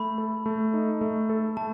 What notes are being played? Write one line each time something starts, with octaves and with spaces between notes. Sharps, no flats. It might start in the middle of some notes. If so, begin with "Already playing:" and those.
Already playing: A3 B5
A4
A3
D#4
A3
A4
A3 A5